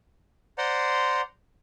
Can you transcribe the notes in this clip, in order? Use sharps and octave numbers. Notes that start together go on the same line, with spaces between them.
C5 D5 F#5 A#5 C6